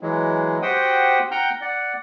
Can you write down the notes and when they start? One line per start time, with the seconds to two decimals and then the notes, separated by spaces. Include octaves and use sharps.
0.01 E3 F#3 G#3
0.62 F#4 G4 C5 F#5 G5 D#6
1.31 F#5 G5 A#5 F6 G6
1.61 D5 F#5